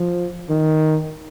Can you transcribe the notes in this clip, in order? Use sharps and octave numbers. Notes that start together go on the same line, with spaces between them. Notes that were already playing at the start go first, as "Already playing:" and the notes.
Already playing: F3
D#3